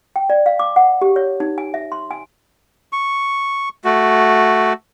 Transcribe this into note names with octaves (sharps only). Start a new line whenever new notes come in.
G5
D5
F5
D6
F#5
G4
C#5
D#4
G#5
E5
C6
G#5
C#6
A3 F#4